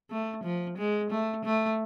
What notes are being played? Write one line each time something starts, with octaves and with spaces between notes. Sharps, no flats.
A3
F3
G#3
A3
A3